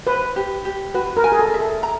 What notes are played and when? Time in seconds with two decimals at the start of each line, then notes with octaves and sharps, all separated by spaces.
0.07 B4 C5
0.36 G4
0.65 G4
0.95 F#4 B4
1.17 A#4
1.24 G#5
1.32 G#4
1.39 A4
1.54 E5
1.60 A4
1.83 A#5